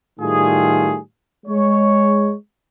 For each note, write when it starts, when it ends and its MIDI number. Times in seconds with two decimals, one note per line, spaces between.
0.19 0.97 45
0.19 0.97 51
0.19 0.97 55
0.19 0.97 57
0.19 0.97 65
0.19 0.97 68
1.46 2.32 56
1.46 2.32 73